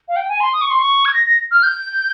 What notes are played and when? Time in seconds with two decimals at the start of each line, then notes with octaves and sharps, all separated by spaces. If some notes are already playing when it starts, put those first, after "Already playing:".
0.08 F5
0.16 G5
0.29 G#5
0.40 C6
0.53 D#6
0.62 C#6
0.70 C6
0.79 C#6
1.05 G#6
1.14 A#6
1.27 A#6
1.51 F6
1.63 G6